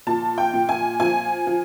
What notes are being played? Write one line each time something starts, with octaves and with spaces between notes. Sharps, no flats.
A#2 A5
G5
A#2
G#5
F3 G#5
F3